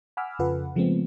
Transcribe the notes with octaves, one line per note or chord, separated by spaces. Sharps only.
F#5 G#5 B5 D6 E6 F6
F2 C#3 F4 A4 B4 F#5
C#3 F3 G#3 A3 B3 C4